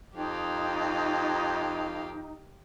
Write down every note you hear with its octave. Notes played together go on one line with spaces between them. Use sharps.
F2 D#4 G4 F5